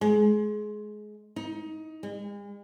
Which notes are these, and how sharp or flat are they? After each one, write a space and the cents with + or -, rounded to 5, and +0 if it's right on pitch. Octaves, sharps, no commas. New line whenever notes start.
G#3 +20
D#4 +20
G#3 -45